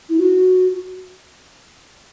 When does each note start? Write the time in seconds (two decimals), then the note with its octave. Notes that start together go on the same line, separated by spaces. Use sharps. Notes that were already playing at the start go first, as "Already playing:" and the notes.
0.09 E4
0.18 F#4